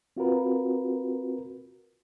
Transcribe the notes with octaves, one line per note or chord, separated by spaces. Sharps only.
C4 F4 F#4 A#4 B4